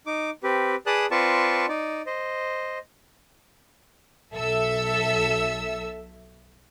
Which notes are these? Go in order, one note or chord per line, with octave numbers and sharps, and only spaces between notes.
D#4 D6
C4 G4 B4
G#4 B4 D5 A5 D#6 F#6
C4 F4 B4 D5 A5 C#6
D#4 D5
C5 D#5
B1 A4 E5 E6